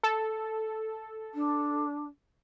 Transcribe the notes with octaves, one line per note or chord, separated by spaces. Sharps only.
A4
D4